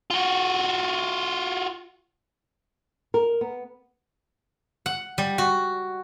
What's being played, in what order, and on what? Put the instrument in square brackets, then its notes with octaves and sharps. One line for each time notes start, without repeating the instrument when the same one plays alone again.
[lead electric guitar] F4 F#4
[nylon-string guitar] A#4
B3
[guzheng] F#5
G3
F#4